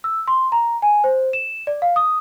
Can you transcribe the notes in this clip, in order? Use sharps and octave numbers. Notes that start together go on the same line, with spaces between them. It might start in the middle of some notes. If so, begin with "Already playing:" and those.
E6
C6
A#5
G#5
C5
E7
D5
F5
D#6